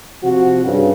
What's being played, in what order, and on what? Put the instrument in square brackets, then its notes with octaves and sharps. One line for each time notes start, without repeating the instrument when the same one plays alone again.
[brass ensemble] C3 F3 F#4
G2 C#3